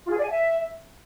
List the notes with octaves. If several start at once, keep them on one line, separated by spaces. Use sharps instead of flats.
F4
G#4
D5
G#5
E5